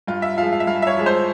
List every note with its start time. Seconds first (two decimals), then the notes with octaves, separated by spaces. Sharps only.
0.07 G2 F4
0.22 E5
0.38 F3 G#3 F5
0.53 F5
0.60 E5
0.67 G2 F5
0.82 E5
0.87 C#5
0.97 F3 G#3
1.06 C5